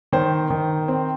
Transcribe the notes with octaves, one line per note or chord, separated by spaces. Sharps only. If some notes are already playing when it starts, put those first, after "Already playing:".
D#3 C5
D#3
C4